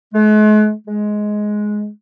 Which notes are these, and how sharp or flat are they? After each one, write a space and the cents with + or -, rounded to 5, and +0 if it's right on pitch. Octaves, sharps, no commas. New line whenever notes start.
G#3 +45
G#3 +10